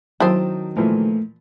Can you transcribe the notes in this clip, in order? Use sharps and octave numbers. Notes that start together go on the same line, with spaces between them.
D#3 F#3 C4 E4 C5 G5 A5 D#6
A#2 E3 F3 A3